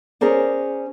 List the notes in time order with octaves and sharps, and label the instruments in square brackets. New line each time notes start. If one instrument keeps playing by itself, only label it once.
[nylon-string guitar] C#4 G#4 A#4 C5 D5